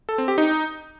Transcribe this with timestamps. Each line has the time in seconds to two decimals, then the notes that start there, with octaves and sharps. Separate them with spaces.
0.09 A4
0.18 C4
0.28 G4
0.38 D#4